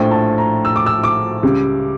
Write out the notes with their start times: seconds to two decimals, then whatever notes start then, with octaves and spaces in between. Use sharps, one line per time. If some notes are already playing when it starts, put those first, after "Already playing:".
Already playing: A#1 A2 F3 G5
0.11 A5
0.38 A#5
0.65 E6
0.76 D6
0.86 E6
1.04 D6
1.43 C#2 C#3 G3